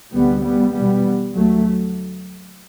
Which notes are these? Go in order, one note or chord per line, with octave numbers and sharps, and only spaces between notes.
D2 C3 G3 B3
G3 B3
E2 B2 G3 B3
D2 F#3 A3